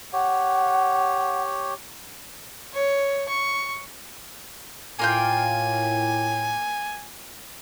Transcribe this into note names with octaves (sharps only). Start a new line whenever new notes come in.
G4 C#5 F#5
C#5
C#6
A2 A#3 F4 G5 G#5